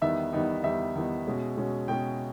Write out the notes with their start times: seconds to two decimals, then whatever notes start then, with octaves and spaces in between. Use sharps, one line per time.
0.01 E2 D#3 G3 B3 D#4 E5
0.33 E2 D#3 G3 B3 D#4
0.64 E2 D#3 G3 B3 D#4 E5
0.95 E2 D#3 G3 B3 D#4
1.26 B2 G#3 C#4
1.57 B2 G#3 C#4
1.88 B2 G#3 C#4 G5